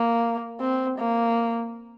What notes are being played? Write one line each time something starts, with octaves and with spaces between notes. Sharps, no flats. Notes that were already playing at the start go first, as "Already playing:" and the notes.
Already playing: A#3
C4
A#3